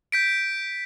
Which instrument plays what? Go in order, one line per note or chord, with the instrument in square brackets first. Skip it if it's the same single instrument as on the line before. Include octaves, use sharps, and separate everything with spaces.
[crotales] G6 B6 D7